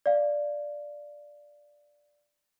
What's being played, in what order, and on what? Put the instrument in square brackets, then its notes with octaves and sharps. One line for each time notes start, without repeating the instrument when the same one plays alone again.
[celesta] D5 F5